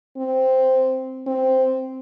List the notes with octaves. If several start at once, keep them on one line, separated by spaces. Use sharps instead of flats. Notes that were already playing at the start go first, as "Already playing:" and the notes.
C4
C4